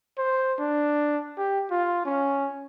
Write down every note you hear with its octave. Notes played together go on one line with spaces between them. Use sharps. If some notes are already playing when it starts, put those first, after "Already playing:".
C5
D4
G4
F4
C#4